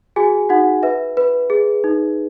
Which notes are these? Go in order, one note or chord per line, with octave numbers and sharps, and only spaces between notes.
F#4 G#4 G#5
D#4 F#4 F#5
B4 E5
B4
G#4
D#4